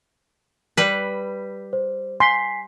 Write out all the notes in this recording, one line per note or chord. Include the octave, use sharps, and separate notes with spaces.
G3 B4
C5
G#5 C6 B6 C7